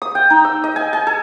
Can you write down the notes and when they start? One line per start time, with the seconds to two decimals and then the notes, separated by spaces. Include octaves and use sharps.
0.02 D#6
0.15 G5
0.30 D#4
0.45 E6
0.64 D#5
0.76 G#5
0.93 G#5
1.07 A4